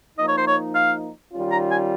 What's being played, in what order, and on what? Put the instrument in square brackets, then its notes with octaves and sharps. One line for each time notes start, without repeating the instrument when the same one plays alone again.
[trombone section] F3 A#3 D#4 [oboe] D#5
[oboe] C#5
C5
C#5
F5
[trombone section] D#3 G3 C#4 F4
[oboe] A#5
G#5